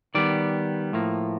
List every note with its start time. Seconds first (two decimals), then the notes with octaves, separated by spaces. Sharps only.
0.15 D#3 G3 B3 D5
0.93 A2 F3 A#3